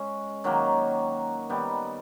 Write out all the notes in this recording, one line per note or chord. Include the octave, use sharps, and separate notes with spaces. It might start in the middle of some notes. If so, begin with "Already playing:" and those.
Already playing: G#3 C#4
D#3 F#3 A#3
D#3 G3 B3